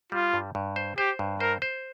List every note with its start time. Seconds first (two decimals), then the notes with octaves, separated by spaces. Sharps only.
0.12 G3 F4
0.34 G2
0.55 G2
0.76 C5
0.98 G4 C5
1.19 G2
1.40 A#4 C5
1.62 C5